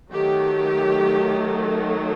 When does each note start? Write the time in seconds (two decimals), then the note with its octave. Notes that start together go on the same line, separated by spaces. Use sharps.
0.12 D#3 F#3 A3 G4